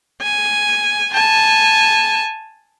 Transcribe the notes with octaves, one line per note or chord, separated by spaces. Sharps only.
G#5
G#5 A5